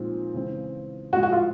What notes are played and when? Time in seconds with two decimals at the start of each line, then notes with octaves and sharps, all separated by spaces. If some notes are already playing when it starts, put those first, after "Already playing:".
Already playing: A#2 F3 G#3 C4 D#4
0.34 C#3 E3 G#3 C4
1.12 A2 F3 G#3 F#4
1.23 F#4
1.32 F4